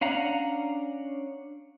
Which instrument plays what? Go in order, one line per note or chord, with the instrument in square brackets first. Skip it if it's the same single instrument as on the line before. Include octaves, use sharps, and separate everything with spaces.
[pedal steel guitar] C#4 D4 F5 F#5 A#5